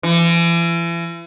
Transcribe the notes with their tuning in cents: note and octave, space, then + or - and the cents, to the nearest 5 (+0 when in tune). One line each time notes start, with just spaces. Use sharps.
E3 +40